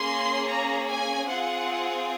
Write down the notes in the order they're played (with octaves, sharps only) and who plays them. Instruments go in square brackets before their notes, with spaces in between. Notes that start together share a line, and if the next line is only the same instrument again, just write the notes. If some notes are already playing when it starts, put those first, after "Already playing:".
Already playing: [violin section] A#3 C#4 G#4 C6
A#5
G#5
C4 F4 G#4 F#5